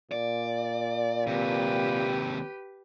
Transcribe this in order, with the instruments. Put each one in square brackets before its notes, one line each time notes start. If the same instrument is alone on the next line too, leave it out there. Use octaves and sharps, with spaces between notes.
[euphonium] A#2 [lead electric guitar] D5
[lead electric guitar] D#2 C3 [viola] G4 B4